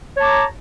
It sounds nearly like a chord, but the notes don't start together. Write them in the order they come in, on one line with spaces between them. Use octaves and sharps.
C#5 A5 D6 A#5